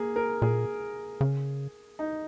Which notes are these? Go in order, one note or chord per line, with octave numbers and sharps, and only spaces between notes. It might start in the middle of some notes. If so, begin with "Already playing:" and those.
Already playing: A#3 G#4
A#4
A#2 G#4
C#3
D#4